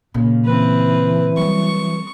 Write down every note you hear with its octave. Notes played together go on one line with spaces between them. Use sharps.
A#2 C#3
E3 C4 B4
F#3 G3 C#6